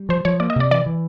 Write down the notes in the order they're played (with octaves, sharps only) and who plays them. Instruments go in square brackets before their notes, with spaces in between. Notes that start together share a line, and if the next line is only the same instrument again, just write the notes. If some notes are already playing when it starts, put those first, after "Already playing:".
Already playing: [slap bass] G3
[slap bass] F3 [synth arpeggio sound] C5
[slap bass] F3 [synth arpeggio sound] C#5
[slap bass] A#3 [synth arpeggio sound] D5
[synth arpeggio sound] D#5
[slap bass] C3 [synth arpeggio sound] D5
[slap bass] E3 [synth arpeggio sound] D5
[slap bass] E3